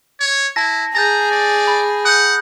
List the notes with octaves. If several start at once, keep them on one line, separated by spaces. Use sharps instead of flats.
C#5
E4 A5 A#6
G#4 A#5 G6 A6 A#6
D5
B5
F#5 D#6 G6